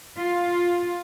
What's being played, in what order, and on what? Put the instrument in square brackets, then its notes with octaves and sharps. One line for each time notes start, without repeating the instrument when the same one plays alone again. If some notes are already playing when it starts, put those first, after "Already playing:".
[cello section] F4